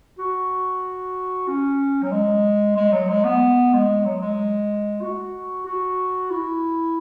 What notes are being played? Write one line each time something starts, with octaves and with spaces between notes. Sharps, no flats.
F#4
C#4
F#3
G#3
G#3
F#3
G#3
B3
G#3
F#3
G#3
F#4
F#4
E4